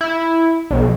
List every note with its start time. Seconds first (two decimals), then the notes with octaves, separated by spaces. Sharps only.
0.01 E4
0.71 B1